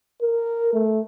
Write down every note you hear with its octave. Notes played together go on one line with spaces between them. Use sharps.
A#4
A3